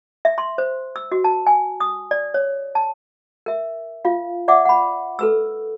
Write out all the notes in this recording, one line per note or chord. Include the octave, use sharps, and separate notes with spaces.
E5
C6
C5
E6
F#4
A5
G#5
D#6
D5
C#5
A5
A#4 E5
F4 F5
D5 E5 F#5 D6
F#5 B5
A4 B4 E6